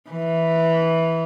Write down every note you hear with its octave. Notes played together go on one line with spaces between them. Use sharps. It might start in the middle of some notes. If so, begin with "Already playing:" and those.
E3